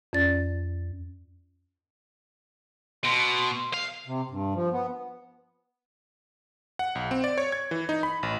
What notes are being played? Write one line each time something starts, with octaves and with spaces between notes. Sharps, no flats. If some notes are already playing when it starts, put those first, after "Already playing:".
F2 C#4 D5 A6
B2 C6
F5
C3
G2
F3
B3
F#5
B1
C4
D5
C#5
G#6
E3
D#4
B5
A1